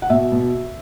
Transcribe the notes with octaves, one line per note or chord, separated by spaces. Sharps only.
F#5
B2 E5
B2